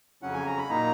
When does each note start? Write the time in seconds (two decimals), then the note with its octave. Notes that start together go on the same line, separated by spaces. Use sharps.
0.22 F2 C#3 F#3 C#4 F#5
0.33 G#5
0.46 A#5
0.58 B5
0.69 A#2 F#3 A#3 D#4 A#5